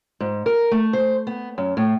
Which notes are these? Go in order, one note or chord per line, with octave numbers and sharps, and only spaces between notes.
G#2
A#4
A3
C5
B3
F#2
A2